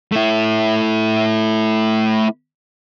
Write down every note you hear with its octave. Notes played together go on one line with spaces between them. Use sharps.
A3 E4